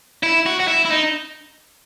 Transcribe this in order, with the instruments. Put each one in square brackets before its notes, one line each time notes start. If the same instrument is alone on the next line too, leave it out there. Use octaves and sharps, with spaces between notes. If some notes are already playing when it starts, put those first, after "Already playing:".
[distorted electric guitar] E4
F#4
F#4
E4
E4
D#4